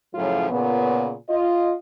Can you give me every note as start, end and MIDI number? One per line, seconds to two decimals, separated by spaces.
0.15 0.50 42
0.15 0.50 45
0.15 0.50 49
0.15 0.50 53
0.15 0.50 54
0.15 0.50 65
0.51 1.12 46
0.51 1.12 49
0.51 1.12 59
1.30 1.73 65
1.30 1.73 75